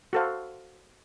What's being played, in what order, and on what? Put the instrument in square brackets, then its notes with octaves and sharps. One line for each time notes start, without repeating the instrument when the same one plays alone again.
[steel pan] F#4 A4 C5 F5